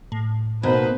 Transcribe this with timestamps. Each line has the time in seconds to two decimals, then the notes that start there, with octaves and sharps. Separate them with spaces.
0.12 A2
0.63 B2 A#3 D#4 B4 C5